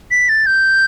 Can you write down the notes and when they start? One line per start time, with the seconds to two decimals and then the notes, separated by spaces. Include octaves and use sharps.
0.11 B6
0.29 A6
0.46 G6